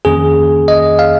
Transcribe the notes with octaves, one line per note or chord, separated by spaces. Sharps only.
F2 D#3 A#3 C#4 G#4
D#5
F5